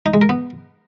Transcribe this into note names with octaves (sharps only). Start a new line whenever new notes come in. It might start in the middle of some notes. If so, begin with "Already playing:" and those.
D#4
G#3
A#4
B3